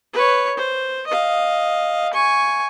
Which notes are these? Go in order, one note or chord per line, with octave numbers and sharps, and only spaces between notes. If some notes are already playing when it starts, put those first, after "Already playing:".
B4 C#5
C5
D#5 F5
G#5 C#6